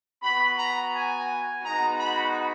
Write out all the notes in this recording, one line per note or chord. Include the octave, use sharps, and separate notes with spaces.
B3 F#4 B5
A#5
G#5
G#3 B3 D#4 F#4 A#5
B5